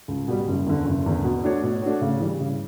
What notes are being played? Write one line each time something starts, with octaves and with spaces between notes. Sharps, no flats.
C#2
B2 G3
F#1
E2 D3
F#1
E2 D3
B2
A3 D4 F#4 C#5
B2
A3 D4 F#4 C#5
C#3
E3 G3
C#3